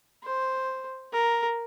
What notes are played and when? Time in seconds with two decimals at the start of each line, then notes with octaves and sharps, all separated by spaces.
0.24 C5
1.13 A#4